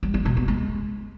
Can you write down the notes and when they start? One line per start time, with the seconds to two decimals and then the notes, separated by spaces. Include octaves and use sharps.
0.03 G3
0.14 F3
0.25 B2
0.37 B3
0.48 G#3